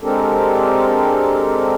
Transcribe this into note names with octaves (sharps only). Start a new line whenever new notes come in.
G#3 C4 D4 G4 A4 A#4